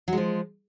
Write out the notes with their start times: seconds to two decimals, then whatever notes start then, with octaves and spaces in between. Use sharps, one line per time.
0.08 F#3
0.13 G#3
0.17 F3